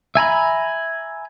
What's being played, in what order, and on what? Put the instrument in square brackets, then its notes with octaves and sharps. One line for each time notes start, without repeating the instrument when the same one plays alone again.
[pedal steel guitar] E5 G#5 A#5 B5